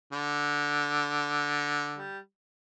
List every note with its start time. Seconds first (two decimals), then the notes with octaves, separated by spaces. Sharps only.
0.12 D3
1.97 G3